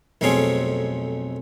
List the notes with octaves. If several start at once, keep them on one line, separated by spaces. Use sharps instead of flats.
B1 F2 A3 C4 C#4 G#4